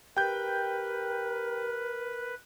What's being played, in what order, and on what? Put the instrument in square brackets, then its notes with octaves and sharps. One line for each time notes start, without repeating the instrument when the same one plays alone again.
[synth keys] G4 [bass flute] A#4 [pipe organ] B4 [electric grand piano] G5 G6